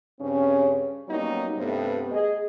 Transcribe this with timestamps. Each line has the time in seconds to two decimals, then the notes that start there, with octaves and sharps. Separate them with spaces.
0.20 G2 C#3 C4 C#4
1.08 F#3 G3 A#3 B3 C#4 D#4
1.57 G2 C3 A3 B3
2.12 G#4 D#5